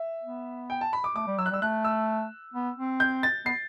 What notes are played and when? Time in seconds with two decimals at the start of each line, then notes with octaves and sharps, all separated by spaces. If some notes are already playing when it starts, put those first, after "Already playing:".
Already playing: E5
0.23 B3
0.70 G5
0.81 A5
0.93 B5
1.04 D6
1.15 A3 D6
1.27 G3
1.38 F#3 E6
1.46 F#6
1.50 G3
1.54 E6
1.62 A3 F#6
1.85 E6
2.54 B3
2.76 C4
3.00 G6
3.23 A6
3.46 B3 C7